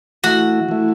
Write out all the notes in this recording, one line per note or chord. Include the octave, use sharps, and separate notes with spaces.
E3 A3 E4 F#4
E3 A3 E4